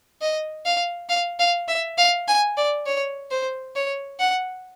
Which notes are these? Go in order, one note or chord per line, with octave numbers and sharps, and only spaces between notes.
D#5
F5
F5
F5
E5
F5
G#5
D5
C#5
C5
C#5
F#5